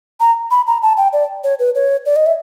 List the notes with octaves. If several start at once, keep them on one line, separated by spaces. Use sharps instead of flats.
A#5
B5
A#5
A5
G5
D5
C#5
B4
C#5
D5
D#5
E5